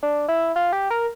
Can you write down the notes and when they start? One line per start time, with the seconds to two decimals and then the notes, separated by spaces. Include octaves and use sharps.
0.03 D4
0.28 E4
0.56 F4
0.72 G4
0.90 A#4